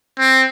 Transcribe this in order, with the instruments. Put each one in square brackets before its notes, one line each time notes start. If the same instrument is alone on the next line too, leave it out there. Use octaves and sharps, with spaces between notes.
[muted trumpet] C4